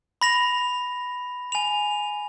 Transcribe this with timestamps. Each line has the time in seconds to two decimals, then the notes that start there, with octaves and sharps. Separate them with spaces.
0.21 B5 A#6 F7
1.52 G#5 F7